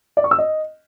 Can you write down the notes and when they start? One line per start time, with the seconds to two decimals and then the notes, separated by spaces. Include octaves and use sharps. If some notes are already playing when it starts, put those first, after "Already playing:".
0.17 D5
0.24 C#6
0.31 E6
0.38 D#5